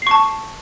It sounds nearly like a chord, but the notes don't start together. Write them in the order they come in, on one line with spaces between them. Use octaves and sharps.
C7 C#6 A5